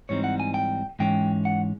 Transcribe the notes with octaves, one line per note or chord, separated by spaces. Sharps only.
G#2 E3 G3 C4 D#4 C#5
F#5
G#5
G5
G#2 E3 G#3 C#4 G5
F#5